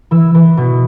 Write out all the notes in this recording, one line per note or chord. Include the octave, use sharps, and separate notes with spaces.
E3 E6
E3
B2